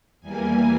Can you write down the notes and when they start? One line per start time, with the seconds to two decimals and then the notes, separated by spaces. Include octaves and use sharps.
0.20 E2 E3 G3 A#3 G#5